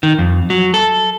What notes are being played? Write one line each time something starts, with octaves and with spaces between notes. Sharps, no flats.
D#3
F2
F#3
A4